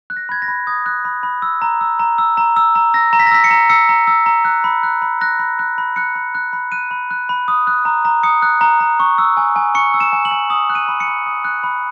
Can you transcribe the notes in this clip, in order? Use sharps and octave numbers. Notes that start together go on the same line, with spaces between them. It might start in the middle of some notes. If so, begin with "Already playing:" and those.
F#6
A#6
B5 G#6
A#6
B5
D#6 G#6
F#6
B5
B5
E6
A#5
E6
A#5
E6
A#5
E6
A#5
E6 A#6
A#5
B6
A#6
E6 B6
C#7
A#5
E6 C#7
A#5
E6
A#5
F#6
B5
F#6
B5
F#6 A#6
B5
F#6
B5
F#6 C#7
B5
F#6
B5
F#6 D#7
B5
F#6
B5
D#6
F#6
A#5
A#5
D#6 C#7
F#6
A#5
A#5
C#6
E6
G#5
G#5
C#6 C#7
E6
E7
G#5
F#7
G#5
D#6 F#7
F#6
D#7
B5
C#7
B5
D#6
F#6
B5